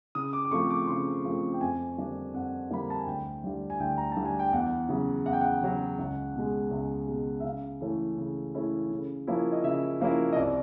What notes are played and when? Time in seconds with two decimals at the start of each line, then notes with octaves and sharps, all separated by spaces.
0.15 C#3 D#6
0.33 D6
0.45 D6
0.51 F3 A3 C4 C#6
0.70 D6
0.88 C#3 C6
1.25 F3 A3 C4
1.54 G5
1.61 F2 G#5
1.98 D3 G3 A#3 D4
2.34 F2 F#5
2.70 D3 G3 A#3 D4 B5
2.82 A#5
2.90 A5
2.99 G#5
3.06 D2 G5
3.44 D3 G3
3.70 G#5
3.80 D2 G5
3.98 A#5
4.12 D3 G3 A5
4.25 G#5
4.39 G5
4.53 E2 F#5
4.89 C#3 F#3
5.26 E2 F#5
5.33 G5
5.41 F#5
5.63 C#3 F#3
5.99 C#2
6.35 B2 G#3
6.71 C#2
7.08 B2 G#3
7.40 E5
7.44 C#3 F5
7.81 E3 A3 C#4 E4
8.18 C#3
8.55 E3 A3 C#4 E4
8.91 C#3
9.27 F3 A#3 C#4 E4
9.52 D#5
9.63 C#3 E5
10.01 F3 A#3 C#4 E4
10.33 D#5
10.36 C2 D5